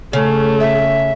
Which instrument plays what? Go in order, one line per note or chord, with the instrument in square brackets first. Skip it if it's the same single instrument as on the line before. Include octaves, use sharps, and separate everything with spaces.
[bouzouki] C#3 [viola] A3
[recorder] E5